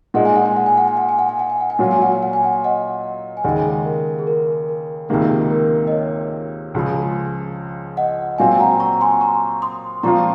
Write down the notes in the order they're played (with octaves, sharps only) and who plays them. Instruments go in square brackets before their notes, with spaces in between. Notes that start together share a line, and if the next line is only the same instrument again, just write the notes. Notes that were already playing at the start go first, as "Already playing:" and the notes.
[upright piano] A#2 G#3 D#4 [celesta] F#5
[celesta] G#5
F#5
G#5
F#5
G#5
F#5
G#5
F#5
G#5
F#5
G#5
F#5
G#5
F#5
G#5
[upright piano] A#2 F#3 C#4 F4 [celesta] F#5
[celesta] G#5
F#5
G#5
F#5
G#5
F#5
G#5
D#5 F#5
G#5
[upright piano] D#2 C#3 G#3 [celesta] D#5 F#5
[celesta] A#4
G#4
A#4
A#4
[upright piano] C#2 C3 D#3 A#3 [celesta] G#4
[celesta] A#4
D#5
C#5
[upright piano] C#2 C#3 F3
[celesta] D#5 F#5
[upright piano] A#2 F#3 C4 [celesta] F5 G#5
[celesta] F#5 A#5
A#5 C#6
G#5 C6
A#5 C#6
C6 D#6
[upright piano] A#2 F3 C4 F4 [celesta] A#5 C#6